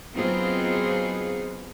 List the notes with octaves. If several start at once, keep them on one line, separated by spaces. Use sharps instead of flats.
F#3 B3 C4 D#4 F4 G#4